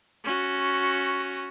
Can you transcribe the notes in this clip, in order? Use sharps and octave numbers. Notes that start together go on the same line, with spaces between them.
C#4 F#4